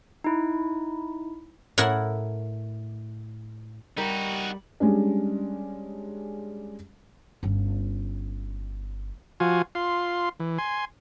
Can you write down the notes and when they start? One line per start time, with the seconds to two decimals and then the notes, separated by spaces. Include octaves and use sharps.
0.24 D#4 E4
1.78 A2 E4 A#4 F#5
3.98 G3 D#4 F#4 G4 A#4
4.80 G3 G#3 C#4 D4
7.43 G1 C#4
9.40 F3 F4 F#4 G#5
9.75 F4 C6
10.40 E3
10.58 G#5 C6